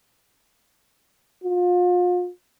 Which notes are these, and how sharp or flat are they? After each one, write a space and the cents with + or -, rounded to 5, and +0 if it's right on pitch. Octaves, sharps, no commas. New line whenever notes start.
F4 +35